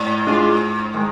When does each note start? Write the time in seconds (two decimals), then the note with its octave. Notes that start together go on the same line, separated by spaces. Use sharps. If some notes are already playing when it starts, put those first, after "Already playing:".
Already playing: G#2
0.27 G#3 D4 F4 G#4
0.94 D#3 G#3